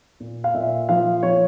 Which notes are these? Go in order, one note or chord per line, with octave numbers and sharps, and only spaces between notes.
A#2
F5
A#2 E5
F3 F5
F3 C#5